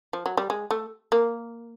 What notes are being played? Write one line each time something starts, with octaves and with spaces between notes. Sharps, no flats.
F3
F#3
G3
G#3
A3
A#3